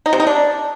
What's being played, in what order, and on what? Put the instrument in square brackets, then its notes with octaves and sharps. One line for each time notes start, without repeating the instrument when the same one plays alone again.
[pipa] D#4
C3
D#4
D4